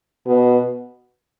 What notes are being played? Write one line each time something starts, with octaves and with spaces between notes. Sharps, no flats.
B2